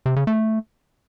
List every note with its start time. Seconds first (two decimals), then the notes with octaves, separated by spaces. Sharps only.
0.06 C3
0.16 C#3
0.27 A3